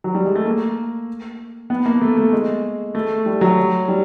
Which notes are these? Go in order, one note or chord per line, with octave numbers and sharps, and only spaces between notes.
F#3
G3
G#3
A3
A#3
B3
A#3
A3
A3
G#3
A3
G3
F#3
G3